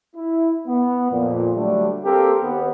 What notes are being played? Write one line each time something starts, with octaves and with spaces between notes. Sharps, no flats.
E4
B3
F2 A#2
D3 F#3 G3 A3 D4
A#3 C4 G4 A4 A#4
D#2 B3